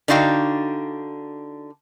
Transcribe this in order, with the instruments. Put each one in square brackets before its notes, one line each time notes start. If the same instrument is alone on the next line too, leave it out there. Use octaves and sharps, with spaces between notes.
[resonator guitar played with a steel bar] D3 D4 D#4 F#4 F5 G5